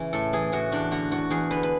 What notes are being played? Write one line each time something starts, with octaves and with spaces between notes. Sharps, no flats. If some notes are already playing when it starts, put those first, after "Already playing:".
Already playing: C#3 E3
A2 A4
E3 G#4
A2 F#4
E2 D4
D3 F#4
E2 F#4
E2 G#4
D3 B4
B4